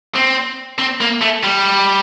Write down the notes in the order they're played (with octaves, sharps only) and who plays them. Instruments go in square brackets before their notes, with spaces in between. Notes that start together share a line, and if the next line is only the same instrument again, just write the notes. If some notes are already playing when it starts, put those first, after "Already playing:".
[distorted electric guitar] C4
C4
A#3
A3
G3